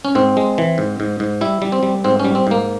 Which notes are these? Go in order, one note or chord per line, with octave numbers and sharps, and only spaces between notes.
C#4
G#2 C4
G#3
E3
G#2
G#2
G#2
G3 E4
G3
C4
G3
G#2 C4
G3 C#4
C4
G#2 A#3